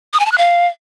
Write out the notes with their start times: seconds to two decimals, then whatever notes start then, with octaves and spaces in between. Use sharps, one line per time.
0.14 D#6
0.20 G#5
0.26 A5
0.32 F#6
0.38 F5